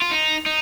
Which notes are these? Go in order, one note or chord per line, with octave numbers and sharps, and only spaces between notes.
F4
D#4
D#4